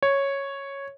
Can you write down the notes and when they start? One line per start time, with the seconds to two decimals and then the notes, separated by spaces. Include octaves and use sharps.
0.03 C#5